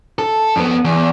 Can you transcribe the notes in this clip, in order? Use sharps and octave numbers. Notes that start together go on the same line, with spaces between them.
A4
F2 B3
E2